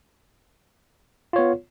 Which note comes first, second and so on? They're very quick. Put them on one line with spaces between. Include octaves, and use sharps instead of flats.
F4 C#5 B3